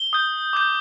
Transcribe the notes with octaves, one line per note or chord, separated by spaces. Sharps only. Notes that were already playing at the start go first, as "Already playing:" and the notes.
Already playing: G7
D#6 G6
D6 G6